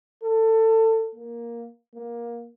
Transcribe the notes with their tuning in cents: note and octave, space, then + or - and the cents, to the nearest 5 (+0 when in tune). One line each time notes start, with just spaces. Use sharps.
A4 +25
A#3 +10
A#3 +15